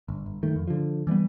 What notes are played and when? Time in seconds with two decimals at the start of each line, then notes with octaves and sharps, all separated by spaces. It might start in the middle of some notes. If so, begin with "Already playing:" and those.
0.08 G1
0.26 G1
0.43 D#3 A3
0.55 F2
0.67 D3 F3
1.07 E3 G3 A3 B3